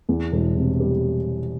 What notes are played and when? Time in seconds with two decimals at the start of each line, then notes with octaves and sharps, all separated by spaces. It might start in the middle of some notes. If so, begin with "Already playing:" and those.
0.09 E2
0.32 E1
0.56 C3
0.80 G3